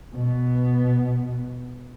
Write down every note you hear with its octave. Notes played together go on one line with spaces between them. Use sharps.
B2 B3